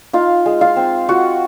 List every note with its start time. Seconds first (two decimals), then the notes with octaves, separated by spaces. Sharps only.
0.13 D#4 F4 F5
0.46 G#3
0.61 F4 F5
0.76 C4
1.09 F4 F#4 F#5